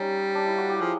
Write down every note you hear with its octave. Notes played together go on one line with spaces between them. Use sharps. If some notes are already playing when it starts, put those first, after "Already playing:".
Already playing: G3 A#3 C#4 D#4
D4
E4
F#4
G4
F3 G#4